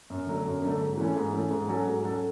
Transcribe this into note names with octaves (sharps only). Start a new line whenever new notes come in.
F#2
D3 F#3 A3
F#2
D3 F#3 A3
G#2
E3 A3 C#4
G#2
E3 A3 C#4
G#2
F#3 C#4 F#4 A4
G#2
F#3 C#4 F#4 A4